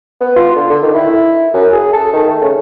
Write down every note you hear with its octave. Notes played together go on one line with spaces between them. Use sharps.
B3
F4
D3
D3
D#3
E4
F#2
G#4
A4
D#3
A3
C#3